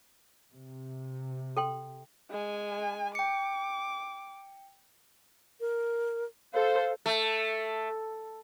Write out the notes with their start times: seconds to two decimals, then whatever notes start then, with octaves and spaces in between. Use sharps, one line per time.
0.53 C3
1.57 A4 G5 C6
2.30 G#3 G#5
3.15 G5 D6 C#7
5.61 A#4
6.53 A4 C5 F5
7.06 A3